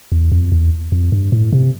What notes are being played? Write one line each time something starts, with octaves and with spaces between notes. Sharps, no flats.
E2
F2
E2
F2
G2
A2
C3